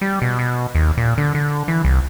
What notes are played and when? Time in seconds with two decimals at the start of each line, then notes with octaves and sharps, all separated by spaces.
0.01 G3
0.22 B2
0.39 B2
0.75 D#2
0.98 A#2
1.18 D3
1.35 D3
1.68 E3
1.85 C2